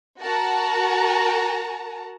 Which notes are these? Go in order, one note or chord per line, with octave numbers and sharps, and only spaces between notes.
F#4 A#4 A5 A#5